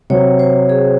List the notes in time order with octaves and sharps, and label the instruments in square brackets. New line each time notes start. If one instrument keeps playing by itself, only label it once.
[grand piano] C3 F#3 C4 [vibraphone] C#5
[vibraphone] C5
G#4